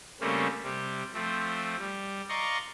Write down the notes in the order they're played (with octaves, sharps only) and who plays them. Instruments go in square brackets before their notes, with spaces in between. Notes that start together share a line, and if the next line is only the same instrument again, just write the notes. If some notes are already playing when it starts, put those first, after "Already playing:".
[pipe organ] C#3 G3 A3 A#3 C4 C#4
C3 G3
F3 A3 C4
G3
D5 D#5 F5 A#5 C6 C#6